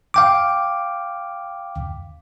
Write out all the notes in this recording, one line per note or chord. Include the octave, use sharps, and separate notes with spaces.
F5 G5 D6